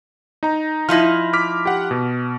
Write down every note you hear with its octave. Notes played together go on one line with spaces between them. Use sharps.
D#4 A#5
F3 D#4 E4 F6 A#6
D6 F6 B6
G4 F#5
B2